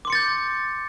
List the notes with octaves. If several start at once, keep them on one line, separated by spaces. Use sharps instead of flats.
C6 D6 G6 A6 C#7